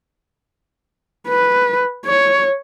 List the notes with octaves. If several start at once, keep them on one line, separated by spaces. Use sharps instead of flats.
B4
C#5